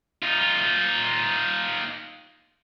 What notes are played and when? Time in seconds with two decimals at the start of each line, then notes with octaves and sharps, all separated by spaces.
0.23 D#4 F4